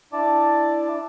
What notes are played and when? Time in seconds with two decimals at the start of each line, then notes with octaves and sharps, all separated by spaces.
0.13 D4 E4 D5 A5 D6